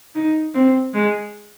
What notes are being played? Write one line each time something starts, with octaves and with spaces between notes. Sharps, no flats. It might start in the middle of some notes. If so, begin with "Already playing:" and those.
D#4
C4
G#3